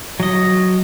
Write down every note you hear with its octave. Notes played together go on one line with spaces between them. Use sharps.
F#3 D#5